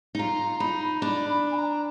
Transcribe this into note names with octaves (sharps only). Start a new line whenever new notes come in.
D#4
F4 A#5
D#4 B5
B5
D4 B5
B5
G#5
A#5